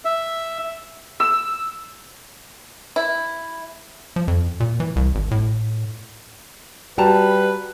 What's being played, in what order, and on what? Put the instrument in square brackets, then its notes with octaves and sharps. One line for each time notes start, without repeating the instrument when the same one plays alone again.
[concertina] E5
[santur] E6
[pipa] E4
[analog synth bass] F3
F2
A#2
E3
C2
G#1
A2
[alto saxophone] G3 [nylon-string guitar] F#4 [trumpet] B4 [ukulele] G5 A5 A#5